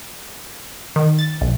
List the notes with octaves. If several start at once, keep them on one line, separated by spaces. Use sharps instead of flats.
D#3
A6
B1